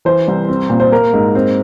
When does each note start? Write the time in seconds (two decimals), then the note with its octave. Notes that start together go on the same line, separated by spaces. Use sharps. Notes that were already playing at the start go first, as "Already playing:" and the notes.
0.05 E3 C5
0.28 C2
0.48 C4
0.70 A#2
0.80 C5
0.92 A#3 A#4
1.14 G#2
1.35 C4